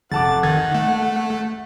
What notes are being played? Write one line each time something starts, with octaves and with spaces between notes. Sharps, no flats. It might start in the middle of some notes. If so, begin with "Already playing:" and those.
F1 F#5 A5 D6 A6
D#3 G#6 A6
A3